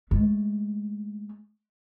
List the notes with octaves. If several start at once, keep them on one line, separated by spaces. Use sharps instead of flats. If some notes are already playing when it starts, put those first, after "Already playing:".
G#3 A3